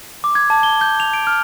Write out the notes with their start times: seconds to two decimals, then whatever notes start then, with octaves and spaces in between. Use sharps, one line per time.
0.24 D6
0.35 G#6
0.50 A5
0.63 G7
0.81 G6
1.00 F7
1.14 D7
1.27 F6